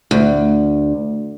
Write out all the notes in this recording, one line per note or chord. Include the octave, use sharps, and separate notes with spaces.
D2